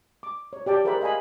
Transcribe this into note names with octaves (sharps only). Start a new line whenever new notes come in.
D6
C#5
G4 D5 G5 A5
G#4 A#4 C5 E5 F#5 B5
D#5 F5 G#5 B5